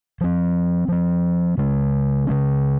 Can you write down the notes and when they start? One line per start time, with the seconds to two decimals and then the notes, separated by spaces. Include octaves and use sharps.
0.21 F3 C4
0.88 F3 C4
1.58 C#3 G#3 C#4
2.27 C#3 G#3 C#4